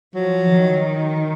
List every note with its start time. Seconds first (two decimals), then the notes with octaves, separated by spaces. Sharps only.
0.15 F3 F#3
0.51 D#3